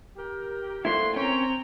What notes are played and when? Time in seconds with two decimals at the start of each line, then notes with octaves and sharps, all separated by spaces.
0.17 G4 A#4
0.85 A3 A#3 C4 D4 E4 C6
1.16 C4 C#4 A#4 C5 C#5 G5 A#5